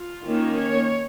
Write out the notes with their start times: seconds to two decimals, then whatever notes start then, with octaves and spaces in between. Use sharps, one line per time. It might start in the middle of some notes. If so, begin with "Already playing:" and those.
Already playing: F4
0.25 D#3 A#3 C#4
0.57 C#5